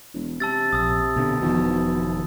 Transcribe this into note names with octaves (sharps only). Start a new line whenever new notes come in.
E1
C3 A5 E6 A6
A#1 D#6 E6
B2 D3
E1 B2 D#3 F3